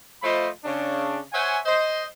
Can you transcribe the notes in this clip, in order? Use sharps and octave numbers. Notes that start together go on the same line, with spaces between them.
F3 A3 F4 C5 D#5 B5
C#3 C#4 D4
C5 C#5 E5 F#5 G#5
C5 D#5